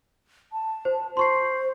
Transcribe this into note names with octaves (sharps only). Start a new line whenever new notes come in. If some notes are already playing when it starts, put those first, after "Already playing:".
A5
C5
C5 C6 C#6 C7